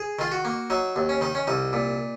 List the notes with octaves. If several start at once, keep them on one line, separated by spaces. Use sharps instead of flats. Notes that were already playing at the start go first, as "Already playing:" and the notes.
Already playing: G#4
D#3 F4
F#4
A#3
F#3 D#4
D#2
C#4
D#3 D#4
C#4
C2 D#4
A#2